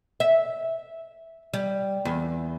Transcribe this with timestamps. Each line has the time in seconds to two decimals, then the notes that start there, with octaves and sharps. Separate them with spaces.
0.20 E5
1.54 G3
2.05 E2